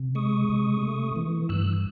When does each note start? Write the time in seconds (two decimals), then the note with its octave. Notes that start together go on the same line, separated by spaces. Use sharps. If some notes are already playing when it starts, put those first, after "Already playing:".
Already playing: C3
0.15 G#3 C#6 D#6
0.49 C3
0.83 A3
1.16 E3
1.49 G2 E6 F#6